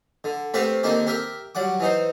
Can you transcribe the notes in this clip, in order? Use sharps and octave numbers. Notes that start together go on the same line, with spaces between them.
D3
A3 C4 G4 B4 C5 F5
D3 D#3 A#3 C4 G4
G4 A#4 E5
F#3 G3 F#5 D6
E3 D#4 C5